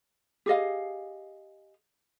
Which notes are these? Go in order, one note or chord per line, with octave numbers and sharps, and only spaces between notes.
G4 G#4 D#5 F5